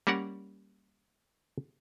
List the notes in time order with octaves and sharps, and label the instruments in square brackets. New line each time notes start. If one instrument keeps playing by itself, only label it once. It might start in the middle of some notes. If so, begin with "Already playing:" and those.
[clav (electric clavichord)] G3 A#3 C#4 A#4 F#5